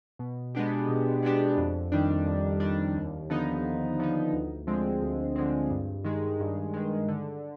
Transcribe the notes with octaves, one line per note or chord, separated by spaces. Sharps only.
B2
G#3 B3 D4 G4
B2
G#3 B3 D4 G4
F2
D#3 G3 D4
F2
D#3 G3 D4
D#2
D3 F3 B3 D#4
D#2
D3 F3 B3 D#4
D2
D3 F3 G#3 C4
D2
D3 F3 G#3 C4
G2
D#3 G#3
G2
D#3 G#3
D3